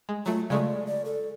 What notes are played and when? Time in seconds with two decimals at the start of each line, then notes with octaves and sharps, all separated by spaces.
0.09 G#3
0.26 F#3 A3 F4
0.50 C#3 G#3 A3 D5
0.87 D5
1.05 A4